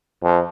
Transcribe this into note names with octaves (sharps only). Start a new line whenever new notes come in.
F2